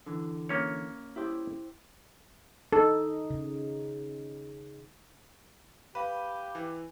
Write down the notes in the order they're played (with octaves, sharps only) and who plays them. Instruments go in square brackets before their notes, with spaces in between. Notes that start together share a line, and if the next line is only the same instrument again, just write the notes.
[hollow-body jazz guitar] D3 E3
[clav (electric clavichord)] A#3 C#4 C#5
[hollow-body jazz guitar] E4 G4 C5
[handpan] D#4 [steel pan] A4
[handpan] C#3
[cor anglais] G4 [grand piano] B4 [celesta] F5 B5
[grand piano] E3